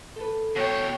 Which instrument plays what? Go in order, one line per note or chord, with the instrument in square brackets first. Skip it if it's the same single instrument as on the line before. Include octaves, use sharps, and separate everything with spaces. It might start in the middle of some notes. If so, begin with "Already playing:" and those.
[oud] A4 B4
[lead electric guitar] B2 G5 [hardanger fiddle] C#5